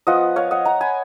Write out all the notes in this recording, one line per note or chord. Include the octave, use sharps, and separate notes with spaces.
F3 B3 F4 D#5 F#5
C#5 F5
D#5 F#5
F#5 A#5
G#5 B5